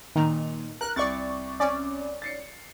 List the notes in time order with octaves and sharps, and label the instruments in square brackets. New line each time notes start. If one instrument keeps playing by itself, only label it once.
[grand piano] A#2 F7 [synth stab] D#3
[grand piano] A#4 [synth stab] F#6
[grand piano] C2 [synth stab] D5 C#6 A6
[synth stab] C#4 D5
[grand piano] A6 C7 C#7